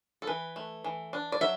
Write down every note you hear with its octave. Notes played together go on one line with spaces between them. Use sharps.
A4
E3 B4
A3
E3
D4
D5
F#3 E5